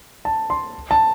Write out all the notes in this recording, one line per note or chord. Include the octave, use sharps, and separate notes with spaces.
A5
C6
A5